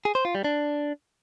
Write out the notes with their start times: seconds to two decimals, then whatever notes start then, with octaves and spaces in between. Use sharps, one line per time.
0.05 G#4
0.15 C5
0.25 F4
0.35 G3
0.44 D4